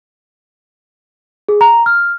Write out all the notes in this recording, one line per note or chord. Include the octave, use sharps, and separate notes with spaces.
G#4
A#5
F6